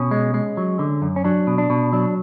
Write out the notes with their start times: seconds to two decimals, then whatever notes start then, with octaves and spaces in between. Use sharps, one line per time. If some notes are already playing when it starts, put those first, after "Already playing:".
Already playing: B2 C#4
0.11 G#3
0.34 G#3
0.57 F#3
0.79 D3
1.02 F#2
1.16 C#4
1.24 F#3 D4
1.47 B2
1.58 D4
1.70 B2
1.93 F#3 D4